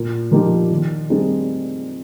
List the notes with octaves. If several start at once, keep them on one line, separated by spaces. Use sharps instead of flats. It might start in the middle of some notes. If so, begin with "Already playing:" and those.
Already playing: A#2
F3 A#3 D#4 G4
D#3
G3 C4 D#4 G#4